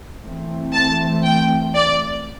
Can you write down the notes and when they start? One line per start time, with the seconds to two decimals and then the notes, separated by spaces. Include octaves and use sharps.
0.24 E3 A3 C4
0.74 A5
1.25 G5
1.75 D5